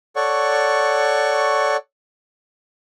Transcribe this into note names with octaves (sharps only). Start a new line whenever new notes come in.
A4 C#5 D5 F#5 C#6